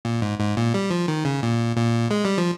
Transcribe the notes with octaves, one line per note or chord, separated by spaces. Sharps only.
A#2
G#2
G#2
A#2
G3
F3
D#3
C#3
A#2
A#2
G#3
G3
F3